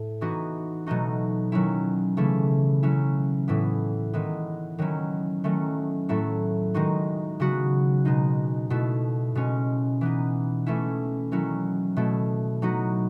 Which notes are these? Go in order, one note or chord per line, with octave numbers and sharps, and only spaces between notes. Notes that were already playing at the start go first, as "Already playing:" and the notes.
Already playing: A2
E3 B3 D#4 F#4
B2 F#3 A3 D#4 F#4
D#3 F#3 C#4 E4
C#3 E3 A3 E4
F#3 C#4 E4
A2 E3 B3 E4
D#3 G#3 B3 E4
D#3 F#3 C#4 E4
D#3 F#3 A3 C#4
A2 F#3 A3 E4
D#3 G#3 D#4 F#4
C#3 F#3 B3 F#4
B2 G#3 D#4
B2 A3 E4
B2 G#3 C#4
E3 B3 D#4
E3 A3 C#4 E4
D#3 F#3 C#4 E4
B2 A3 E4
F#3 B3 D#4 F#4